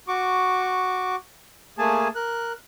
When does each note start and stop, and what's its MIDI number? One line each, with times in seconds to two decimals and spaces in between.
0.08 1.16 66
0.08 1.16 85
0.08 1.16 86
1.78 2.08 57
1.78 2.08 58
1.78 2.08 68
1.78 2.08 80
1.78 2.08 81
2.15 2.52 70
2.15 2.52 90